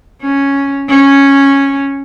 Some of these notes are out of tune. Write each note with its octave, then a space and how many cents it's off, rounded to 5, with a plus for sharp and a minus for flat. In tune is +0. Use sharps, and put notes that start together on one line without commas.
C#4 +0
C#4 -5